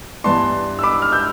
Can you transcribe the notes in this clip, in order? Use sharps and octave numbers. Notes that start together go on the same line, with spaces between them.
G2 E3 B3 D4 A5 C6
E6
B5 D6
F6
E6 G6